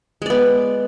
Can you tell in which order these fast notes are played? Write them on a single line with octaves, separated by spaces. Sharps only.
G#3 D5 B3